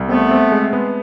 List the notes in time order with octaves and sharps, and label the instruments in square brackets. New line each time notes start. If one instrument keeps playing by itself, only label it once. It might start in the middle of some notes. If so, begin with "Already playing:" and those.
Already playing: [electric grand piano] C2
[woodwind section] A3 B3 [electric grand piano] C4
[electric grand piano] C4
G#3
B3